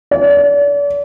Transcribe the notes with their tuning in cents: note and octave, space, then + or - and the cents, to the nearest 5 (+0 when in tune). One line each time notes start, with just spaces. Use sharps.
D5 -40